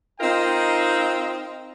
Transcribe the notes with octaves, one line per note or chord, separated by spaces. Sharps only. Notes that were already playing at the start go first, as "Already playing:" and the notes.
C4 D#4 F4 A#4 D#5 G5